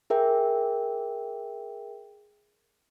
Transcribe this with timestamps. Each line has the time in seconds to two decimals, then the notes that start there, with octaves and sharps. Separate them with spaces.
0.10 G#4 A#4 E5 G5